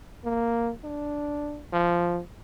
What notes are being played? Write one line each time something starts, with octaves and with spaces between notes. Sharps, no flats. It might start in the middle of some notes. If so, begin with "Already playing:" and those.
A#3
D4
F3